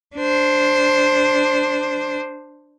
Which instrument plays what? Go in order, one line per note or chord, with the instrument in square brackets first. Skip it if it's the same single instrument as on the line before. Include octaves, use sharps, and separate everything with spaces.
[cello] D4 C5